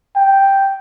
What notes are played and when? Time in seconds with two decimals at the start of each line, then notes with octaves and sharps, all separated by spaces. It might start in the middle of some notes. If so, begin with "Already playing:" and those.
0.16 G5